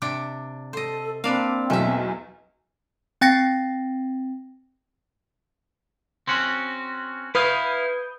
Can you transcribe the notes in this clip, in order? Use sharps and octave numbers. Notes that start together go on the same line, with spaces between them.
C3 D4 G5
A4 C5 D#5
A#3 C4 D4 B4 D5 F5
B1 E2 B2 A3 E5
C4 G5 A6 A#6 C#7
C4 C#4 F#4
E4 B4 F5 D#6 G6